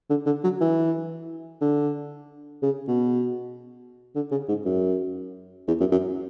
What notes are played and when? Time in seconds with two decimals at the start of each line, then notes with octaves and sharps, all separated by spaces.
0.10 D3
0.26 D3
0.44 F#3
0.61 E3
1.62 D3
2.63 C#3
2.88 B2
4.15 D3
4.31 C#3
4.49 G#2
4.65 F#2
5.68 E2
5.80 F#2
5.92 F#2